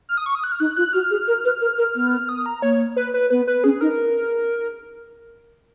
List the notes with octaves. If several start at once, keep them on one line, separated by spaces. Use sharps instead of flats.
F6
D#6
C#6
D#6
F#6
F6
D#4 F#6
F4 F#6
F#4 F6
G#4
A#4
B4
A#4
A#4
B3
D#6
A#5
A#3 C#5
B4
B4
B3 B4
B4
C#4 G#4
D#4 A#4